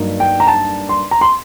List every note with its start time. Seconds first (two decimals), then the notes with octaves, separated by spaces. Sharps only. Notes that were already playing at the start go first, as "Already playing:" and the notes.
Already playing: G2 F#3 A#3 D#4
0.20 G5
0.40 A#5
0.47 A5
0.89 C6
1.11 A#5
1.21 C6